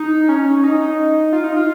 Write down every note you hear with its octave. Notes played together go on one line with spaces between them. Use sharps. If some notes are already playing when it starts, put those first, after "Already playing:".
Already playing: D#4
C#4
D#4
D#4
F4
D#4
F4